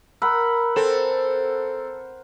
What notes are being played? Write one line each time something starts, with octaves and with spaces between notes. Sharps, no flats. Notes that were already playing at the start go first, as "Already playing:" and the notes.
A#4 F#5 A#5 B5 E6
C4 A4 E7